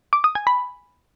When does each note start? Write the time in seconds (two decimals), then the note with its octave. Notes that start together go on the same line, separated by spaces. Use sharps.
0.13 D6
0.24 D#6
0.35 G#5
0.47 B5